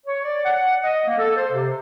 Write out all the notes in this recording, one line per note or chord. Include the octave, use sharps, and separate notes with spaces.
C#5
D5
F#5
D#5
A#3
A4
C5
C3